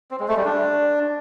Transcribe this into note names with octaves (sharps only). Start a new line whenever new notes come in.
C4
G#3
A3
G3
D4